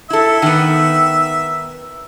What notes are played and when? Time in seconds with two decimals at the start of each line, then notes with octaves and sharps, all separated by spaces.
0.10 E4 A4 E5
0.42 D#3 B3